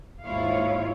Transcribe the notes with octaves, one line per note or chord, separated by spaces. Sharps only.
D#2 G#2 E4 F4 C#5 F5